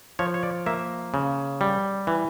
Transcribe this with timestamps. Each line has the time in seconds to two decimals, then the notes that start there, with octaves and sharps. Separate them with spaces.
0.19 F3 C#5
0.34 C#5
0.43 D5
0.66 A#3 E5
1.14 C#3
1.61 G3
2.07 E3